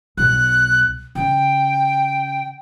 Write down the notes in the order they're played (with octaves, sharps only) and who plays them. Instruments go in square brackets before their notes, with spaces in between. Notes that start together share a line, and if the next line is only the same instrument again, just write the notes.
[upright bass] B1 [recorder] F#6
[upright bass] C#3 [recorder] G5